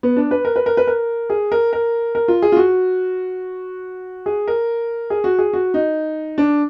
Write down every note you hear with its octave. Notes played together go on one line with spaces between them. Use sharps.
B3
D4
B4
A#4
B4
A#4
B4
A#4
G#4
A#4
A#4
A#4
F4
G#4
F4
F#4
G#4
A#4
G#4
F#4
G#4
F#4
D#4
D4